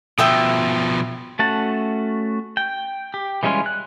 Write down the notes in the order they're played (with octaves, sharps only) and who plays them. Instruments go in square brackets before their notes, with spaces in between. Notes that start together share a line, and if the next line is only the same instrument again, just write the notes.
[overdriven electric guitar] B2 F3 [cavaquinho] E5 G5 D#6
[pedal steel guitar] A3 C#4 F#4 A5
G5
G4
E3 G3 G#3 C#4 F4
F#6